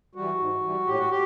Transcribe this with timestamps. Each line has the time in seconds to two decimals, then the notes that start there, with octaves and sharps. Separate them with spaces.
0.15 E3 G3 F#4
0.39 G#2
0.63 E3 G3
0.86 A2 G4
0.98 F#4
1.11 G4